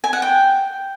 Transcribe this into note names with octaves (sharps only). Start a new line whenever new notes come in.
G#5
F#5
G5